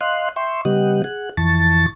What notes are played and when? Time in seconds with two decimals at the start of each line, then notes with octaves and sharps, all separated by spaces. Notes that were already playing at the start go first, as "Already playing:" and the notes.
0.01 D#5 F5 C6 F#6
0.36 E5 G5 C6 C#6
0.65 C#3 G3 B3 G4 D#5 F#5
1.04 G#4 F#5
1.37 F2 E3 A5 C#6 A6